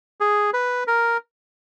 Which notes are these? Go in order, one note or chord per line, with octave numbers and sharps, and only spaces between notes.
G#4
B4
A#4